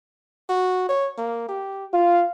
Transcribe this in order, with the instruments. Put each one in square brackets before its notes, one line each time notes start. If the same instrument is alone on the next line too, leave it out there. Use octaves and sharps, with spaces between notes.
[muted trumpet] F#4
C#5
A#3
G4
[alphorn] F4 [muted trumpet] F5